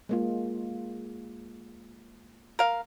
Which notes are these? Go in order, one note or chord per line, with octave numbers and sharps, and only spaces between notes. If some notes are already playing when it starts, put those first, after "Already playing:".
G#3 A#3 F4
A#4 F5